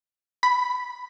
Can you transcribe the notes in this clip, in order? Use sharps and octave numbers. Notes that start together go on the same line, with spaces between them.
B5